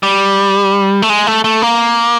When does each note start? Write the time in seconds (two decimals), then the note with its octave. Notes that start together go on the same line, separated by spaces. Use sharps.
0.03 G3
1.02 A3
1.09 G#3
1.27 A3
1.44 A3
1.62 A#3